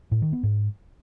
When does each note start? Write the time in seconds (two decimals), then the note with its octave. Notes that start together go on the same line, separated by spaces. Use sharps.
0.11 A2
0.22 D#3
0.33 B3
0.43 G#2